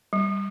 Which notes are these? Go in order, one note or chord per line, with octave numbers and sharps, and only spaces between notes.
G3